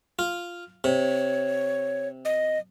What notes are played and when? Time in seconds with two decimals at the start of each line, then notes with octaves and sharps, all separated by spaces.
0.19 F4
0.84 C3 C#5
2.25 D#5